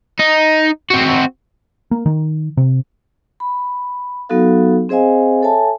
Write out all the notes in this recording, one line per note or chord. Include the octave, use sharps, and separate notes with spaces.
D#4
C4 F#4
A#3
D#3
C3
B5
F#3 B3 D#4 F#4 A4 F5
C4 G#4 C5 D#5 F5 G#5
A4 C#5 E5 G#5 A5